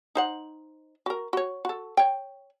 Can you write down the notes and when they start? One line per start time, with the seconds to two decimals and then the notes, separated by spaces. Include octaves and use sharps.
0.15 D#4 C5 F#5
1.06 F#4 A#4
1.33 F#4 C#5
1.65 F#4 A4
1.97 C#5 G5